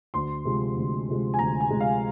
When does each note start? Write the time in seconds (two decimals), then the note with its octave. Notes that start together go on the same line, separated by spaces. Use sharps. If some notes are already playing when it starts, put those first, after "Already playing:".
0.14 D2 C6
0.45 C3 F3 G#3
0.76 D2
1.09 C3 F3 G#3
1.34 G#5
1.39 D2 A#5
1.60 G#5
1.70 C3 F3 G#3
1.80 F5